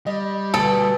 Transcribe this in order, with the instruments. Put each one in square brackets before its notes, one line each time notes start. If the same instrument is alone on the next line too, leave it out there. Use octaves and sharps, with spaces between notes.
[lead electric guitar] G3 [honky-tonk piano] D#5
[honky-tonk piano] D2 D#6 D7 [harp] B2 [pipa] A4